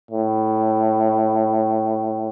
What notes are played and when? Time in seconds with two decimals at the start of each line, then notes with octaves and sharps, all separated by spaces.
0.11 A2